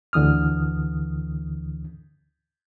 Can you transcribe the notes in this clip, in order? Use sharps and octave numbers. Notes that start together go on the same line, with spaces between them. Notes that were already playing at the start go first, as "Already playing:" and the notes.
D2 D3 E3 D#6 F6